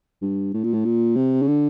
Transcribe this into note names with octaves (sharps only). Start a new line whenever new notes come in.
G2
A2
A#2
A2
A#2
C3
C#3
D3